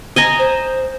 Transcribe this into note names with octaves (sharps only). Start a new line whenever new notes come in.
D#5 G#5 A#5
C5